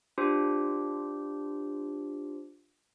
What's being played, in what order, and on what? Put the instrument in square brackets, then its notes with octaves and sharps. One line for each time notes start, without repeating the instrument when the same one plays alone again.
[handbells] D4 F4 G4 C5